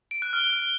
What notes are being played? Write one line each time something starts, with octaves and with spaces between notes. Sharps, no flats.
D7
F#6
F6